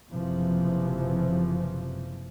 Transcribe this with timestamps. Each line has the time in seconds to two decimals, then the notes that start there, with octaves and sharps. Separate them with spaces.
0.12 F#1 C3 E3 F3